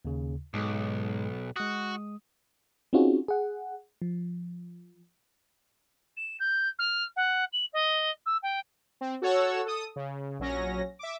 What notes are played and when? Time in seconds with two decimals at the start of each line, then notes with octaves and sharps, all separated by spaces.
0.05 D#2 C#3
0.54 B1 G#2 G#3
1.56 G#3 F#4 D#6
2.93 C4 C#4 D#4 F4 F#4 G#4
3.28 G#4 F#5
4.02 F3
6.17 E7
6.40 G6
6.79 F6
7.16 F#5
7.53 F#7
7.73 D#5
8.26 E6
8.43 G5
9.01 C4
9.22 F#4 A4 C#5 F#5 E6
9.66 A4 D#6
9.96 C#3
10.39 A#1 F#3 C#4 A#6
10.99 E5 D6